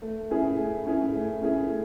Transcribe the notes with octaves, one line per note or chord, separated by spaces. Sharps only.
A3
C#4 E4 G#4
A3
C#4 E4 G#4
A3
C#4 E4 G#4
A3